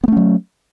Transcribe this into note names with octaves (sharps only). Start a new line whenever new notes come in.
F#3 A3 B3 C#4